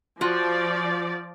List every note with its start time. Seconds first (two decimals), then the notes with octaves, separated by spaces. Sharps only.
0.21 F3 F4 F#4 D5